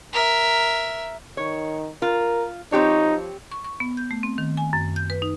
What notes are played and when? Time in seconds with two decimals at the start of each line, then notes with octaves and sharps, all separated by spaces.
0.13 A#4 E5
1.37 D#3 C#5
2.02 F4 A#4
2.72 F3 C4 D#4 G4 C#5
3.52 C#6
3.64 C#6
3.80 B3
3.97 G6
4.11 A3
4.23 C4
4.38 D#3
4.57 G#5
4.73 F#2
4.96 G6
5.10 B4
5.22 D#4